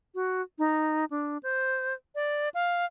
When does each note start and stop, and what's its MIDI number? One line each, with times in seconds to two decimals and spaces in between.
0.15 0.42 66
0.59 1.05 63
1.10 1.38 62
1.43 1.94 72
2.15 2.49 74
2.54 2.86 77